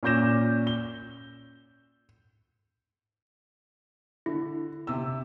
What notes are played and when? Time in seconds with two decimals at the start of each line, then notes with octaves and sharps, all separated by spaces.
0.03 A#2 C#4 D6 G6 A#6 E7
0.67 G7
4.26 D3 E4
4.87 C3 E6